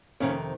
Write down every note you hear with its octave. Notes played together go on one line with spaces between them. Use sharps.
F2 C3 D#3 A#3 C#4